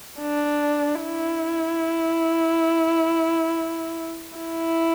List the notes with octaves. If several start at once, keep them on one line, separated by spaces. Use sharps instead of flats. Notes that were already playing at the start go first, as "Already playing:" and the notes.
D4
E4
E4